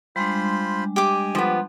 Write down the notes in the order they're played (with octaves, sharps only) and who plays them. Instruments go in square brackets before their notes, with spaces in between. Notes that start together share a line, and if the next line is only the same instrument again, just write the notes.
[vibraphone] G3 G#3 D4 [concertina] F4 C5 B5
[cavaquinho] G4 D6 [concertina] D#5 G#5
[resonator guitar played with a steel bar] F3 B3